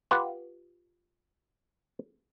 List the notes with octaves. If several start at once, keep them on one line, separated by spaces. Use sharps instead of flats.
F4 G4 B4 F#5